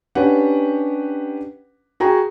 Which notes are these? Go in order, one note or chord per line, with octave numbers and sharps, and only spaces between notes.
C#4 D4 G4 B4 F#5
F#4 G#4 G5 A#5